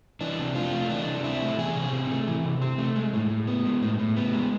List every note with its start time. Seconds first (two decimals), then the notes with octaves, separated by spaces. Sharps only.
0.21 E3 D4
0.39 C3
0.55 C4 F4
0.72 A3
0.90 E3 D4
1.07 C3
1.24 C4 E4
1.41 A3
1.58 E3 G#4
1.76 C3
1.93 C4
2.10 A3
2.27 E3
2.44 C3
2.62 C4
2.78 A3
2.96 G#3
3.13 A2
3.30 A2
3.47 B3
3.65 G#3
3.82 A2
3.99 A2
4.17 B3
4.34 G#3